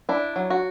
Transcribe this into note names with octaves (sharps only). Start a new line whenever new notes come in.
D4 E4
F#3
F#4